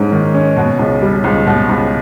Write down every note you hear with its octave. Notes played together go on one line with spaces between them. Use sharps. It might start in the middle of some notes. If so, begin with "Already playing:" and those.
Already playing: G#2 G#3 C#4
D#3
C#4
B2
C#2
G3
C#2
B2
C#2